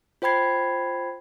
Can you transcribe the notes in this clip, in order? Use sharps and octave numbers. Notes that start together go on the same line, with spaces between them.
F4 C5 G5 B5 G#6 C7